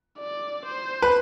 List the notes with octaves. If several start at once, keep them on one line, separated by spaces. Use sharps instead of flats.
D5
C5
B4